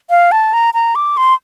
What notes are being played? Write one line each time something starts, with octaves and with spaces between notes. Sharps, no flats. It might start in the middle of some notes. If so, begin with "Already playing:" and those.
F5
A5
A#5
A#5
D6
C6